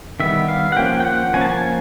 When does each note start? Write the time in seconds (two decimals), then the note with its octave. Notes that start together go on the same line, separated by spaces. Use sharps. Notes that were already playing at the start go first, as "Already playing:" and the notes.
0.20 D#3 G3 B3 E5
0.48 F5
0.72 F#5
0.77 F3 A#3 C#4 G5
1.00 G5
1.05 F#5
1.33 F3 A#3 C#4 G#5
1.41 A5
1.50 G#5